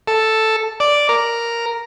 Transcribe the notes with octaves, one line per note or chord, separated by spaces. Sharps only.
A4
D5
A#4